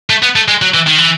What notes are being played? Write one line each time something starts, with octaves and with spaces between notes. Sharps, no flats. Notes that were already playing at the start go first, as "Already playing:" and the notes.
A3
B3
A3
G#3
F#3
E3
D#3
E3